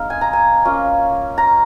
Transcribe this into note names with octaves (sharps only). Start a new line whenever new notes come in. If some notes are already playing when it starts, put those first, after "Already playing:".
Already playing: G#3 C4 D#4 F5
G#5
A#5
G#5
A#3 C#4 F4
A#5